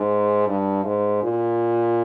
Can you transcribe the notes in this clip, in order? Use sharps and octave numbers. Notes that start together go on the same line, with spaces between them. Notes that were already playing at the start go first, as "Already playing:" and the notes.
Already playing: G#2
G2
G#2
A#2